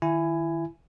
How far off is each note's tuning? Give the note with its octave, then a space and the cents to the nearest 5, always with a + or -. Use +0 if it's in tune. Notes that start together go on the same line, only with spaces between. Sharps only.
D#3 +0 E4 +20 G#5 +0